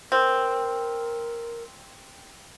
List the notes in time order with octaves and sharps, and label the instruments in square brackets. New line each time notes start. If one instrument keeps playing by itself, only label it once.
[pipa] C4 [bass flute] A#4